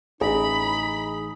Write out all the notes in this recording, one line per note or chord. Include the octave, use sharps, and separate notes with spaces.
A1 D#4 G#4 B5